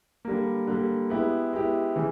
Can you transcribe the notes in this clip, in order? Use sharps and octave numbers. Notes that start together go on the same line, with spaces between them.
D3 G3 A#3
D3 G3 A#3
G#3 B3 E4 G4
G#3 B3 E4 G4
C#3 E3